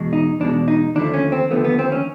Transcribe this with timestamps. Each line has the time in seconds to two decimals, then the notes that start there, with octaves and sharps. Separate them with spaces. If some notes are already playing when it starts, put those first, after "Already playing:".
Already playing: E2 B2 G#3
0.13 D#4
0.40 E2 B2 G#3 D4
0.68 D#4
0.95 D#2 D3 F3 A3 D4
1.14 C#4
1.32 C4
1.51 D#2 D3 F3 A3 B3
1.65 B3
1.79 C4
1.92 C#4